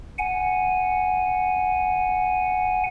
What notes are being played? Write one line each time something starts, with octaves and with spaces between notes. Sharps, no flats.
F#5 G#5